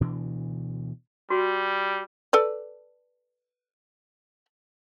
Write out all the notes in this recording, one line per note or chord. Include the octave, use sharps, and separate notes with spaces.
D2 B2 E3 D4
G3 F#4
A4 B4 D5